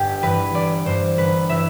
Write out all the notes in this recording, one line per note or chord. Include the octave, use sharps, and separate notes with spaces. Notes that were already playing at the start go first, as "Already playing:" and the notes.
Already playing: G1 G4
G2 E3 B4
G1 D5
G2 E3 C5
G1 B4
E3 E5